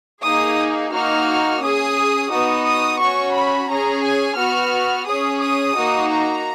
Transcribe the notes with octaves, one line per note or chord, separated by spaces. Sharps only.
A#3 D#4 G#4 D#6
A#3 D#4 F#4 F6
C#4 G#4 D#6
B3 D#4 F#4 D#6
D#6
C#4 F#4 C#6
B5
C#4 G#4 A#5
G#5
B3 F#4 F6
C#4 G#4 D#6
D#6
A#3 D#4 F#4
A#5